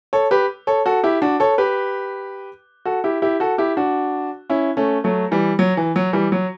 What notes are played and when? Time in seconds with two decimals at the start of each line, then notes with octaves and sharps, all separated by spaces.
0.13 A4 C#5
0.31 G4 B4
0.67 A4 C#5
0.86 F#4 A4
1.04 E4 G4
1.22 D4 F#4
1.40 A4 C#5
1.58 G4 B4
2.85 F#4 A4
3.04 E4 G4
3.22 E4 G4
3.40 F#4 A4
3.58 E4 G4
3.77 D4 F#4
4.50 C#4 E4
4.77 A3 C#4
5.04 F#3 A3
5.31 E3 G3
5.59 F#3
5.77 E3
5.96 F#3
6.13 E3 G3
6.32 F#3